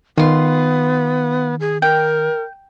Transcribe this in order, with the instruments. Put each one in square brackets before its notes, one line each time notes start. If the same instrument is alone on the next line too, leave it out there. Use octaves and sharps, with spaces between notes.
[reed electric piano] D#3 [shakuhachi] B3 [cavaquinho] F4 C6
[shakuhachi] G#4
[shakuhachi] A#4 [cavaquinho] G5